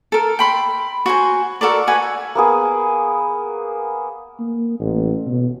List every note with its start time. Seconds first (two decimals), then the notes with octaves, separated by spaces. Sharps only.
0.12 A4 A#4
0.39 G5 B5 C6
1.06 F#4 C5 G#5
1.61 F#4 A4 A#4 D5
1.87 F#4 B4 G#5
2.35 A#3 B3 G#4
4.40 A#3
4.80 A1
5.26 B2